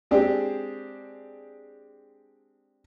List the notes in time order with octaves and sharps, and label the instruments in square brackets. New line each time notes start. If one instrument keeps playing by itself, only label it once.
[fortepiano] G#3 C4 D4 G4 G#4